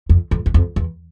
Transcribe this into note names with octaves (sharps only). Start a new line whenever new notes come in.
F2
F2
E2
F2
E2